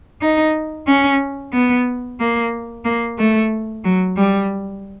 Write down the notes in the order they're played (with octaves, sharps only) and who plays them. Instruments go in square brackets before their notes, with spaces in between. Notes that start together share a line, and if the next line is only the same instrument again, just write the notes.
[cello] D#4
C#4
B3
A#3
A#3
A3
F#3
G3